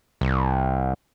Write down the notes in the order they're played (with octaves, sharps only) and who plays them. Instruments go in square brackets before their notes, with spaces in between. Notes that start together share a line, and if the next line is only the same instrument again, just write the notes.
[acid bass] C2